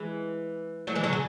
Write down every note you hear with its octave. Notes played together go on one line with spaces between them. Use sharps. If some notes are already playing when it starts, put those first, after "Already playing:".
Already playing: E3 G#3
F#3 A3
E3 G#3
D3 F#3
C#3